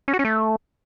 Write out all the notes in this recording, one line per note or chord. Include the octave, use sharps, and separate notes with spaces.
C#4
F#4
C#4
A3